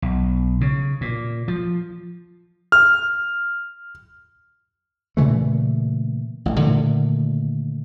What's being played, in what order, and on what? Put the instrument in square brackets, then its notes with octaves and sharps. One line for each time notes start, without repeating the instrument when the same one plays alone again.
[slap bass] B1
C#3
A#2
F3
[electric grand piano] F6
[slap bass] A#2 C#3 E3 A3
A1
A#2 D3 D#3 A3